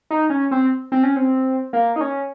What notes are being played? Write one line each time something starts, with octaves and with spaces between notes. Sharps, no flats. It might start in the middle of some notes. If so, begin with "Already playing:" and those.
D#4
C#4
C4
C4
C#4
C4
A#3
D#4
C#4